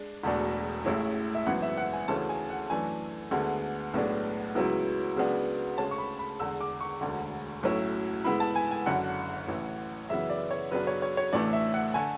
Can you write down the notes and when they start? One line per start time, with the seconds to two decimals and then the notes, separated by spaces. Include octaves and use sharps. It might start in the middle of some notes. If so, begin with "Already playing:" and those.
Already playing: G#3 D4
0.23 E1 E2 B2 A3 D4
0.85 A1 A2 G#3 C#4 E4
1.35 E5
1.47 G#1 F#2 E3 B3 F#5
1.62 E5
1.78 F#5
1.93 G#5
2.08 D2 C#3 E3 A3 C#4 A5
2.29 G#5
2.50 F#5
2.70 F#2 E3 A3 D4 G#5
3.31 D2 D3 G#3 B3
3.94 B1 A2 G#3 B3 D4
4.55 C#2 C#3 F#3 B3 E4
5.16 C#2 C#3 F#3 B3 D4
5.78 D2 C#3 G#3 C#4 A5
5.91 C#6
5.98 B5
6.19 B5
6.40 E2 D3 G#3 E6
6.61 D6
6.81 C#6
7.01 E1 D2 D3
7.63 B1 A2 F#3 C#4 E4
8.25 G#2 G#3 B3 E4 B5
8.40 A5
8.56 G#5
8.71 G#5
8.86 F#1 F#2 D3 F#5
9.48 A1 A2 E3
10.09 F#2 C#3 E3 B3 E5
10.29 D5
10.51 C#5
10.71 F#2 C#3 F#3 B3 D4 B4
10.87 C#5
11.02 C#5
11.17 C#5
11.33 A1 A2 E3 A3 D4 D5
11.53 E5
11.74 F#5
11.94 D3 A3 G#5